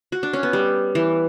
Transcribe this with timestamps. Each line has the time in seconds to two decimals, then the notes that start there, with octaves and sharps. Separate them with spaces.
0.12 F#4
0.23 D4
0.33 C#4
0.43 B3
0.53 G3
0.95 E3